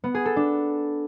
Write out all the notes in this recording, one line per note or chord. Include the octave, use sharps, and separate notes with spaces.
B3
G#4
A4
D4